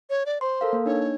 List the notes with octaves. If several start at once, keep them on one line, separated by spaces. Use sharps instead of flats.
C#5
D5
C5 C6
A4 A#4 F5
A#3
D4 D#4 C#5